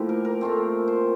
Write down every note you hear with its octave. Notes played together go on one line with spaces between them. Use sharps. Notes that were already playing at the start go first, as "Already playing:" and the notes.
Already playing: A2 F3 A#3 E4 G4
A#4
A#4
A#2 A3 C4
C5